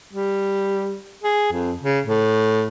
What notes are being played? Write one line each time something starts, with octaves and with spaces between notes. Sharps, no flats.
G3
G#4
F2
C#3
A2